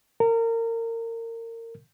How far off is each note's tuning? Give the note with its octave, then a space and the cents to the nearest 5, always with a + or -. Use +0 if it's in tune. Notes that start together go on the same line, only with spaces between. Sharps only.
A#4 -30